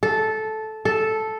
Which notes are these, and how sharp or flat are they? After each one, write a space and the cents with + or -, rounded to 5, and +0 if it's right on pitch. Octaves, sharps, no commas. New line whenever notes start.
A4 -10
A4 -5